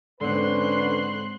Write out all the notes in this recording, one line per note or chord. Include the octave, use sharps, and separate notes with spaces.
G#2 D3 C4 C#4 B4 C6 F#6